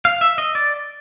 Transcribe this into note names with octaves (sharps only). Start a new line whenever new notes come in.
F5
E5
D#5
D5